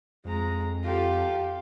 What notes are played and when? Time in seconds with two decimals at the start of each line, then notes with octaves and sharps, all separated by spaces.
0.25 F2 G#3 A#5
0.84 F4 G4 A4